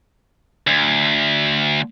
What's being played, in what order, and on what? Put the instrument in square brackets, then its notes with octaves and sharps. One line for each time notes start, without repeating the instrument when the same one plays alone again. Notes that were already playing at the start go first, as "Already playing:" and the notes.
[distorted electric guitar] D2